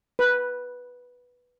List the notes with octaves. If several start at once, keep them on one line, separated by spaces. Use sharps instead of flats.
B4